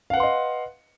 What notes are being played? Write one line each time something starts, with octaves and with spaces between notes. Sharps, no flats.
B4 D#5 F5 F#5 C6